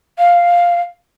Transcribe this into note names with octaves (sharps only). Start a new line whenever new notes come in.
F5